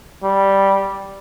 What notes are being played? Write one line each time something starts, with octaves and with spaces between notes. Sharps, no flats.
G3